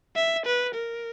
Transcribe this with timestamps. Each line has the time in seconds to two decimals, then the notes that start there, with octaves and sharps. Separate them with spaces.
0.16 E5
0.46 B4
0.75 A#4